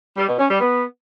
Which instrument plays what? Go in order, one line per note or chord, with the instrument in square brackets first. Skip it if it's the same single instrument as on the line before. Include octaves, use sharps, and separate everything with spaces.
[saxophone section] G3
B2
C#4
G3
B3